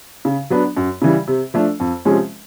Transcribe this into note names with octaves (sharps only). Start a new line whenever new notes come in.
C#3
F#3 B3 D4
F#2
C#3 E3 G3
C3
F3 A3 D4
F2
C3 F3 G#3 C#4